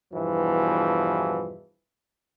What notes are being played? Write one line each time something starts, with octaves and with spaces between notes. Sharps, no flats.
E2 G2 B2 E3 F3